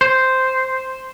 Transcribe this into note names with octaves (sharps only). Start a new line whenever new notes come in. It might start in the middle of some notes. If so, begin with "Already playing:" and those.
C5